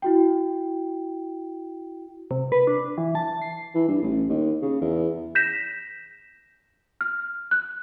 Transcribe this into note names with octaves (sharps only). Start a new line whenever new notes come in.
E4 F#4 G5
C3
B4
D4
E3
A5
C7
E3
G2
A1
D#2
C#3
E2
G6 A#6 B6 E7
F6
F#6